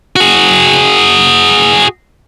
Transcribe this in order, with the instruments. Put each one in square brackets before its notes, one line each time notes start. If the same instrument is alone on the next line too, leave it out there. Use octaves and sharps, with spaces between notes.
[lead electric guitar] F#4 G#4